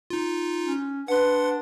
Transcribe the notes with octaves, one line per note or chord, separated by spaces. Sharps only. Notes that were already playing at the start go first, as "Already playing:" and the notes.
D#4 F4
C#4
D4 B4 F#5 C6